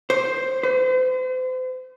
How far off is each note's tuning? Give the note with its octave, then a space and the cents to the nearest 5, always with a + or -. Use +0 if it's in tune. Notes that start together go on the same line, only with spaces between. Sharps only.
C5 +5
C5 -40